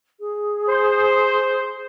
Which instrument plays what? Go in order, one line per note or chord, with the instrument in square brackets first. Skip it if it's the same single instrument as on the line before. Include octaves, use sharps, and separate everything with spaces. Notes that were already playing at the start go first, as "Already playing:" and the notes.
[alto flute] G#4
[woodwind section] C5